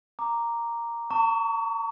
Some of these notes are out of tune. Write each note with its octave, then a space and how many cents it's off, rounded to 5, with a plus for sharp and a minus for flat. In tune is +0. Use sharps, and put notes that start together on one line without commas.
A#5 +0 D6 +0
A#5 -45 C#6 +30